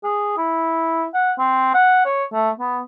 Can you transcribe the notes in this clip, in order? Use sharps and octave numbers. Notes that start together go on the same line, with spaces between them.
G#4
E4
F#5
C4
F#5
C#5
A3
B3